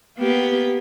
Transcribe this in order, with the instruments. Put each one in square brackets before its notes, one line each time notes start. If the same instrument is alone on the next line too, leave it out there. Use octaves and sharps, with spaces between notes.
[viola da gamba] A#3 B3 G4